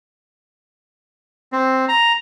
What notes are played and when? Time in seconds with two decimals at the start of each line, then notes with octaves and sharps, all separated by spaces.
1.53 C4
1.88 A#5